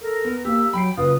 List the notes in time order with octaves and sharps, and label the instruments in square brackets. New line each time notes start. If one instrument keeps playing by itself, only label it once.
[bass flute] A4 [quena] A#4
[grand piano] B3
[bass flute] A#3 [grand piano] G4 [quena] E6
[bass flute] F#3 [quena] G5 [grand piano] B5 C7
[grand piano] F#1 F4 [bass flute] B4 [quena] D#6